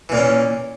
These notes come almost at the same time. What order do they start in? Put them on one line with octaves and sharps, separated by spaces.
E3 A#2 A#3 C#4